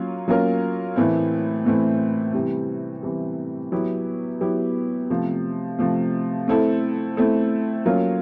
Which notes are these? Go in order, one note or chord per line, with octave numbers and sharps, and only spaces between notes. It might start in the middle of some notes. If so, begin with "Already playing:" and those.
Already playing: F#3 A#3 C#4 F4
F#3 A#3 C#4 F4 A#4
A2 E3 A3 C4 E4
A2 E3 A3 C4 E4
C3 E3 G3
C3 E3 G3
F#3 B3 E4 G4
F#3 B3 E4 G4
C3 F3 A3
C3 F3 A3
A3 C4 E4 A4
A3 C4 E4 A4
F#3 A#3 C#4 F4 A#4